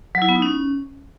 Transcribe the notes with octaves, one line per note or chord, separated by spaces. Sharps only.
F#3
E4
B3
D#4
C#4